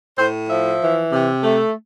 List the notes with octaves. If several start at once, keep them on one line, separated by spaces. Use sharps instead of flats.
A2 C5
F3 E5
E3
C3
A3